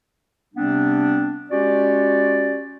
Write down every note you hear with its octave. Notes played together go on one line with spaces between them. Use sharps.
C3 G3 B3 C4 D4
G#3 C#4 F#4 G4 D5